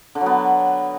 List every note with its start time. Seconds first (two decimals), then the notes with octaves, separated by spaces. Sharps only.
0.15 D3
0.21 F#3
0.26 B3